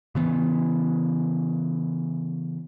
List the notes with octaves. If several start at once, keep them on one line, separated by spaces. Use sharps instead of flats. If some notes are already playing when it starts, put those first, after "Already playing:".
C#3 E3 B3